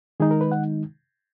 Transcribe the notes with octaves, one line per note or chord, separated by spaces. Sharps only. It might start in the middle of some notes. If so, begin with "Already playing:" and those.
D#3 G#3 D#4 G#4
A#4
B4
F#5